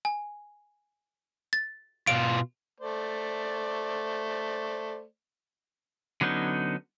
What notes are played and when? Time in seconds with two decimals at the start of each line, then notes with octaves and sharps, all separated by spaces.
0.05 G#5
1.53 A6
2.07 B2 F4 D7
2.80 A3 C5 D5
6.21 D3 F#3 B3 C#4 D#4